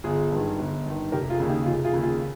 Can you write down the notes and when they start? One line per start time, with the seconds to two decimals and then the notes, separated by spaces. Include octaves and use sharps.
0.04 G1 F4 G#4
0.32 G2 D#3
0.59 G1
0.86 G2 D#3
1.12 F1 G4 A#4
1.30 F4 G#4
1.40 D#2 C#3
1.48 D#4 G4
1.66 F1 F4 G#4
1.85 F4 G#4
1.93 D#2 C#3
2.03 F4 G#4